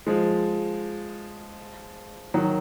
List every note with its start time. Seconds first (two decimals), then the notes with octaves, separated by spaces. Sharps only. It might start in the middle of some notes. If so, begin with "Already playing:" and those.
0.07 F3 G#3
2.34 D#3 F#3